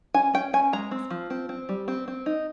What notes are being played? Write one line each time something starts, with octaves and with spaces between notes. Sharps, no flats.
C#4 G#5
C#4 G5
C#4 G#5
G#3 A#5
C4
F3
C4
C4
G3
C4
C4
D#4